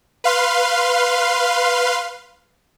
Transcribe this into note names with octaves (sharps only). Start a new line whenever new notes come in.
B4 F5 C6